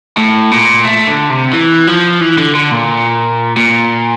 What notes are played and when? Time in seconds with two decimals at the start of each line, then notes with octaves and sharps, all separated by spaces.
0.18 A2
0.51 A#2
0.85 A3
1.07 D3
1.30 C3
1.53 E3
1.87 F3
2.21 E3
2.38 D3
2.55 D3
2.71 A#2
3.57 A#2